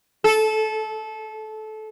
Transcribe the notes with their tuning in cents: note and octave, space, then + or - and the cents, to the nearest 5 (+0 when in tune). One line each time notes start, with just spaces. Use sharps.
A4 -20